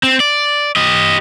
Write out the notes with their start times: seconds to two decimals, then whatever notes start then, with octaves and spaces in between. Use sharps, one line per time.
0.03 C4
0.20 D5
0.76 G4 D#5